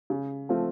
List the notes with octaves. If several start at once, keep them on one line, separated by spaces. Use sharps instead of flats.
C#3
F3 A3 C4 F4